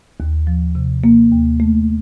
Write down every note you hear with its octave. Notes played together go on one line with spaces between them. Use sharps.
D#2
F3
C3
A#3
D#2
A3